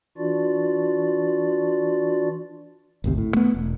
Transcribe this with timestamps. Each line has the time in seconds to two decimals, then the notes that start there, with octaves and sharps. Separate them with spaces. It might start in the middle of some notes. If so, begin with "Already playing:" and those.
0.17 E3 D4 F4 F#4 D5
3.04 G#1 D2 C3
3.18 A2
3.34 A3 B3
3.54 E1